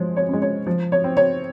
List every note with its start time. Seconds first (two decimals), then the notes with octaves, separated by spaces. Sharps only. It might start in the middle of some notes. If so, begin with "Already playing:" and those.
Already playing: F3 G#3 C5 C#5
0.16 C#5
0.29 G#3 C#4
0.42 C#5
0.67 F3
0.92 C#5
1.04 C4
1.17 C#5